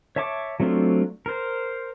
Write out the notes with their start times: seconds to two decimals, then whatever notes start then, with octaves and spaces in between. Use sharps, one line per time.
0.16 C#5 E5 A5 C#6 D6
0.60 F#3 A3 C4 D4 F4
1.26 A#4 C5